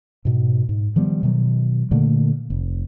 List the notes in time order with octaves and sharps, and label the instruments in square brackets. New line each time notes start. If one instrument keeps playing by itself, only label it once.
[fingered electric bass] G#2 B2
G#2
D#3 F3 G3 B3
B2 D#3 F#3
A#2 D3 A3 A#3
F1